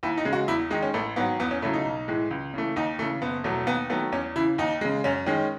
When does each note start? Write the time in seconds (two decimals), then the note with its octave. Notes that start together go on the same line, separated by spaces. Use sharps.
0.03 D#2 E4
0.18 D#4
0.25 C#3 G#3
0.33 F#4
0.48 E2 E4
0.70 D#3 G#3 D#4
0.82 C#4
0.94 A1 A3
1.16 G#2 D#3 F#3 B3
1.40 E2 B3
1.51 C#4
1.62 C#3 F#3 A3 E4
1.74 D#4
1.85 B1
2.08 A2 E3 G#3
2.31 C#2
2.54 C#3 E3 A3
2.76 D#2 D#4
2.98 E3 A3
3.02 C#3
3.22 F#1 B3
3.44 E2 B2 F#3 A3
3.67 D#2 B3
3.90 D#3 F#3 A3 B3
4.12 E2 C#4
4.36 C#3 E3 E4
4.58 D#2 D#4
4.81 C#3 G#3
5.04 F#2 C#4
5.26 D#3 G#3 C#4